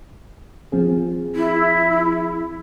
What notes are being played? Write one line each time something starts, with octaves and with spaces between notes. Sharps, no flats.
F3 C4 G#4
E4